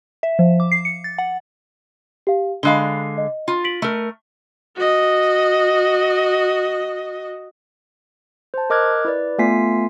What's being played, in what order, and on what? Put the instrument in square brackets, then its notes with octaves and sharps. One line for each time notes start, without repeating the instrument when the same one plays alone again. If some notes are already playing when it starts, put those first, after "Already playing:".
[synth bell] E5
F3
D6
C7
C#7
A6
F#5
[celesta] G4 F5
[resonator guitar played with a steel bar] D3 G#3 F5 [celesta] B5 F#6 G7
[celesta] D#5
[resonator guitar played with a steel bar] F4
[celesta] B6 D7 F#7
[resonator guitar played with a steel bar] A3 A#4
[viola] F#4 D#5
[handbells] C5 A5
A#4 D#5 D6 F6 F#6 G#6
E4 B4 D5
A3 B3 F4 G#5 B6 C7